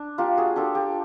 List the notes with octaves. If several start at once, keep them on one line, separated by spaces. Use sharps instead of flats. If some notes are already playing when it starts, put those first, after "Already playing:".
Already playing: D4
A#3 F4 G4
F#4 G#4
D4 F4 G4 A4
G4 A4